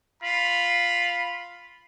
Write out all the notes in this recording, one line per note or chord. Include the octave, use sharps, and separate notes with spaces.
F4 B5